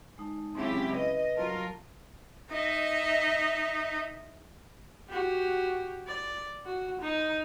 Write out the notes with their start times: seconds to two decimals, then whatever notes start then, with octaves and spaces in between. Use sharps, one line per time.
0.18 G#3 D#4 A5
0.55 C#3 F#3 G#3 C4 E4 G4
0.93 B4 D#5
1.37 F#3 F4 A#4 A5
2.51 D#4 D#5 E5
5.09 F#4 G4
6.07 D5
6.66 F#4
7.01 D#4